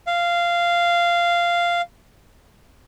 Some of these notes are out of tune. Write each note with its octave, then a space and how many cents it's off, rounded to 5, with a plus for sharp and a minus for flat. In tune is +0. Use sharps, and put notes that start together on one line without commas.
F5 -10